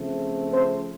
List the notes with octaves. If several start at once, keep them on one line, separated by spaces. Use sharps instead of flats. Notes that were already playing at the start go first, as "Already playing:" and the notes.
Already playing: C#3 F3 A3 C4
C4 C5